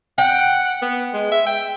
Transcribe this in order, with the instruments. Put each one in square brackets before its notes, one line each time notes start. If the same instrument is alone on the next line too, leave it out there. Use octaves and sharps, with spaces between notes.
[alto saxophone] F#5 [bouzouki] G5
[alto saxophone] B3
G#3
E5
G5